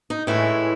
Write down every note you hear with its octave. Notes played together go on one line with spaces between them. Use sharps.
D#4
A2 E3 G#3 C#4 E4